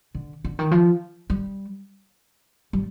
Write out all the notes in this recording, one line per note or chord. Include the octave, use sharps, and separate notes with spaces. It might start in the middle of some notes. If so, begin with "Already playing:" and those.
D3
D3
D#3
F3
G3
G3